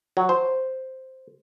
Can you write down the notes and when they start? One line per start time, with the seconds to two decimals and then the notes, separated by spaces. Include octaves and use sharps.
0.17 F#3
0.29 C5